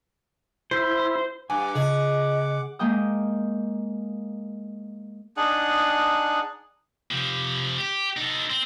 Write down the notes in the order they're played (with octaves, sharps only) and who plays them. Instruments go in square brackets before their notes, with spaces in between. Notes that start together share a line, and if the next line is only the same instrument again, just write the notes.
[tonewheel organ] E4 [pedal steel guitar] C5
[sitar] G2 [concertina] F#5 D6 [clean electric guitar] G#5
[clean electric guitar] C#3 [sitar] G#4 [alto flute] D#5
[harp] G#3 A#3 G5 D#6
[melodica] D4 D#4 G#4 F#5
[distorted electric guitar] C3 F3
G4
D#4 A4
C4